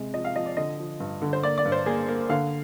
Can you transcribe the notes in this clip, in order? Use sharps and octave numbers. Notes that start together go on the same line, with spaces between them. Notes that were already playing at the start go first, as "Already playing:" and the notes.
Already playing: C3 G#3
F3 D#5
F5
F3 D#5
D5
D3 D#5
F3
G2
D3
C5
A#3 D5
D5
G2
C5
A#3 G#4
A#3
D3 F5